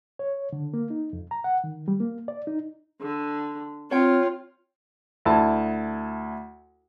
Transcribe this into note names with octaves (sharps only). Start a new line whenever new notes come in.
C#5
D3
A#3
D#4
F2
A#5
F#5
D#3
G3
A#3
D5
D#4
D3
C4 F4 C#5 G5
D2 E4 A5